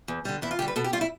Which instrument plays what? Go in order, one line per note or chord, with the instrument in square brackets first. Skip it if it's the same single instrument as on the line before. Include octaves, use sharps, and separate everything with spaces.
[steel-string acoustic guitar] E2
D3 G3
E2 E4
F4
D3 G3 G4
B4
B2 A4
G4
G3 F4
E4